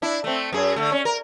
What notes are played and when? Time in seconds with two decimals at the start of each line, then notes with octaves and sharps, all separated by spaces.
0.02 D4 E4
0.24 A3 C4
0.53 F#2 G#4
0.76 D3 A3
0.92 C#4
1.05 A#4